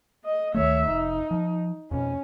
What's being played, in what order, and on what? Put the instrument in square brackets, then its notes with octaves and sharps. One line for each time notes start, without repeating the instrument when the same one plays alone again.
[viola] D#5
[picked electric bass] D2 D#3 A3 [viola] C#5 E5
[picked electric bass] F1 [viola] D#4
[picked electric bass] F3
[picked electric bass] F2 B2 [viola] C#4